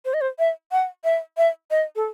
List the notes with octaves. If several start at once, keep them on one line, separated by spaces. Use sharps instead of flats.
C5
D#5
C5
E5
F#5
E5
E5
D#5
A4